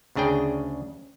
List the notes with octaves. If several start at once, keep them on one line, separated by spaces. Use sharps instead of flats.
D2 C#3 D4 G#4 G5